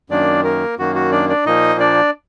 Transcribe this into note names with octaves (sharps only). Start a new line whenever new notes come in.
F#2 D#3 A#3 D4 D5
A#3 A#4
F#2 D#3 A#3 F#4
F#4
D4 D5
D4 D5
A#2 F3 A#3 D#4 D#5
D4 D5